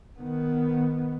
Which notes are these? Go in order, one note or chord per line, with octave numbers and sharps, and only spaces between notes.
D#3 B3